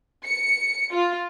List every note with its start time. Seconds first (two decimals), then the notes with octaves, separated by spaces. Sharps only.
0.25 C#7
0.93 F4